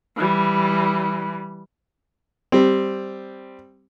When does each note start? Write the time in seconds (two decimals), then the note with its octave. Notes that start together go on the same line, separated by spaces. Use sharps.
0.16 E3 G3
2.52 G3 C4